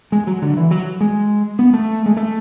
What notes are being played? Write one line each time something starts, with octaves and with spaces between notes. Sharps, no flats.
G#3
F#3
D3
E3
F#3
G#3
B3
A3
G#3
A3